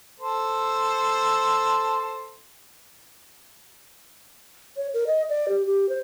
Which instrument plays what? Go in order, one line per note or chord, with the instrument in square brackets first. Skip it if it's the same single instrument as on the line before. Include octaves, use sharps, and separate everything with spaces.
[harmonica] A4 C5
[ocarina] C#5
A#4
D#5
D5
G4
G4
C5